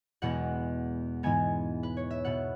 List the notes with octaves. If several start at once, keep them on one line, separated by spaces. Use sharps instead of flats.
E2 B2 G#3 B3 F#5
G#2 E3 G#3 B3 G#5
B4
C#5
E5
B2 B3 F#5